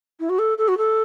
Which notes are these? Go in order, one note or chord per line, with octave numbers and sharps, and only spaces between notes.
E4
F#4
A4
A4
F#4
A4